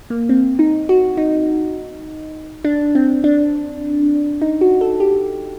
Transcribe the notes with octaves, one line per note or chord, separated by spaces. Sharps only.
A#3
C4
D#4
F#4
D#4
D4
C4
D4
D#4
F#4
A4
G4